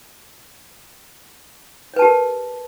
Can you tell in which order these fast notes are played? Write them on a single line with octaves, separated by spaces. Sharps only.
C#5 B4 A5 G4 A#4